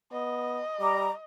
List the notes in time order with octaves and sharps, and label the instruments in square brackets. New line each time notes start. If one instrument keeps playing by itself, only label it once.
[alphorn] B3 [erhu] D#5
[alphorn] G3 [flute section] A#5 D6